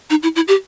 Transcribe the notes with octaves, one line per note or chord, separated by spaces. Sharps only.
D#4
E4
E4
G4